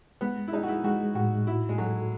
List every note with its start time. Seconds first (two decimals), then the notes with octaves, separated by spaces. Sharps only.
0.21 G#3 B3
0.48 E4
0.52 D#4 G#4
0.63 F#4
0.68 E4
0.84 G#3 F#4
1.15 A2 F#4
1.47 E4 F#4
1.69 G#3
1.78 F#3 A4